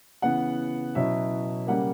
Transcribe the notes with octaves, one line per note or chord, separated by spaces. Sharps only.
C#3 E3 B3 F#5
B2 F#3 C#4 E4 E5
C#3 G3 A#3 F#5